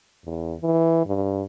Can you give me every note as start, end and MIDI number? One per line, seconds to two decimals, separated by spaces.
0.24 0.55 40
0.61 1.02 52
1.06 1.44 43